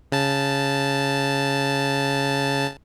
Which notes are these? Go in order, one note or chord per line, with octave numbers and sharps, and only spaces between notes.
C#3 A5